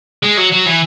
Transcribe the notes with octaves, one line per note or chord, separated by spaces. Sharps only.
G#3
F#3
F#3
E3